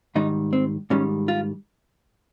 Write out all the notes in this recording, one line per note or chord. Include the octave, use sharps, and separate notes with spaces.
G#2 D#3 G3 D#4
C4
G#2 D#3 G3 C#4
F4